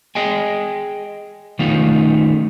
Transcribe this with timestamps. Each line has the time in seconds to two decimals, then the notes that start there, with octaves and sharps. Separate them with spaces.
0.15 G#4 D#5 G5 G#5
1.59 D#3 A3 B3 C#4 D#4 F4